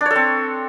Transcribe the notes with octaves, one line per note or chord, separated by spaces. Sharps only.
C4 D4 A4 C#5